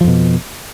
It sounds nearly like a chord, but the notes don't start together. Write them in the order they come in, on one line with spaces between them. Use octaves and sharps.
F3 F2 B2